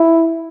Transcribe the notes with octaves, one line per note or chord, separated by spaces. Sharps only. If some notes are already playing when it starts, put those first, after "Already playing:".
Already playing: E4